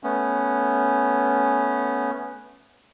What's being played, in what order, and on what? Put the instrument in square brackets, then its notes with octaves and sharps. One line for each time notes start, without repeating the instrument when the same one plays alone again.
[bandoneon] A3 B3 C#4